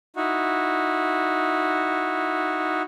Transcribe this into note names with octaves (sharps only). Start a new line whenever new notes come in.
D#4 E4 F#4